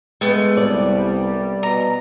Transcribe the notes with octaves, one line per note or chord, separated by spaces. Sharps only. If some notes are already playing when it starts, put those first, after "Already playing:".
G#3 A3 B3
C2 G3 D5
B2 A#5